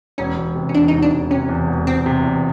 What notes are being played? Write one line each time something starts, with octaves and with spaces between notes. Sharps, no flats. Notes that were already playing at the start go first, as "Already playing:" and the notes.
E1 C#4
E1
C3
C#4
E2 D4
D#4
E1
D4
E1
C3 C#4
E2
E1
E1 C4
C3
E2